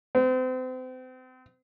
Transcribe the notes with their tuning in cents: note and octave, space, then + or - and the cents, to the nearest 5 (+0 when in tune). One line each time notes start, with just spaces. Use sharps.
C4 -35